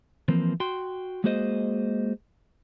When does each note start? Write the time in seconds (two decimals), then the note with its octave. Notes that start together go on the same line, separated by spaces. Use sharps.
0.28 E3 F3 A#3 C4
0.60 F#4 G5 C6
1.24 G#3 A#3 F#4 G#4 C5 D#5